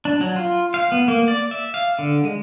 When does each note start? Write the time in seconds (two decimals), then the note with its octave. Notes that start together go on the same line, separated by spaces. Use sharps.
0.05 D4
0.21 F#3
0.36 F4
0.74 F5
0.92 B3
1.08 A#3
1.28 D5
1.51 E5
1.74 F5
1.99 D3
2.23 G#3